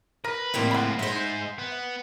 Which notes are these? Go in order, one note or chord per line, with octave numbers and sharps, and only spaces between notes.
A#4 B4
A2 F3 G3 A#3 C4
G#3 F4 F#5 B5
G#3 D#4 C5 E5
B3